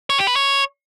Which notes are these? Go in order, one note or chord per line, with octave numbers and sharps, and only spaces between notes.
C#5
G4
B4
C#5